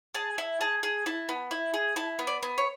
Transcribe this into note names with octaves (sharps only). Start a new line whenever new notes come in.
G#4 A5
E4
G#4 A5
G#4
E4 A5
B3
E4
G#4
E4 A5
B3
D5
B3
C#5